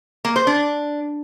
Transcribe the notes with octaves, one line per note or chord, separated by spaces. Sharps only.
A#3
C5
D4